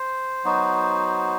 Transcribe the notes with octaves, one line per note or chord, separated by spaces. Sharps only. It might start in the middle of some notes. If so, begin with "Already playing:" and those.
Already playing: C5
F#3 B3 D#4 F#4